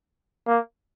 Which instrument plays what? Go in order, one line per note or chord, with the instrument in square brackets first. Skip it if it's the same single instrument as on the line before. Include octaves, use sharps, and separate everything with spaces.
[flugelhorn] A#3